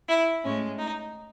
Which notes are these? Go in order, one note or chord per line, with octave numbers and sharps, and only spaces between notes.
E4
A2 G#3 C#4
D#4